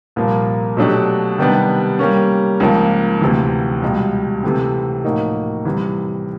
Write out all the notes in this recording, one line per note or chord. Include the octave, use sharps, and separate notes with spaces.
C2 A#2 F3 A#3
B2 F#3 A3 D4 G4
C3 D#3 G3 B3 D4
G3 A#3 C#4
C#2 C#3 F3 A#3
D2 C3 E3
C#2 B2 G3
C3 E3 A3 C4
A2 F3 A#3 D#4 F#4
C2 C3 E3